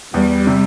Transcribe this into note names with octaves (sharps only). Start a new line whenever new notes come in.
E2 G3
C3